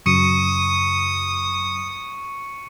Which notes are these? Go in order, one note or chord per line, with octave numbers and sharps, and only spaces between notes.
F#2 C#3 F#3 C#6 D#6 C#7 D#7